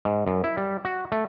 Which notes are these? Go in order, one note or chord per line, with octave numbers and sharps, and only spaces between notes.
G#2
F#2
E4
G3
F#4
A3